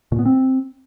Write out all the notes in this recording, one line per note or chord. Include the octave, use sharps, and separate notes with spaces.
A#2
B3
C4